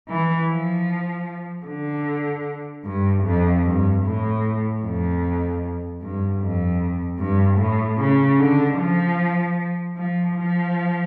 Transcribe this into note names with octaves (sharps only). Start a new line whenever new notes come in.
E3
F3
D3
G2
F2
G2
A2
F2
G2
F2
G2
A2
C#3
D3
F3
F3
F3